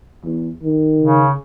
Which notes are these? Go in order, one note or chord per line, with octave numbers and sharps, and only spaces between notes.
E2
D#3
C#3